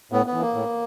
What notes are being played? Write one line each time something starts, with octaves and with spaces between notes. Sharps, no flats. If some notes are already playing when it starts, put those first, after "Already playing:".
A2 B3
B3
E3
A#3
A2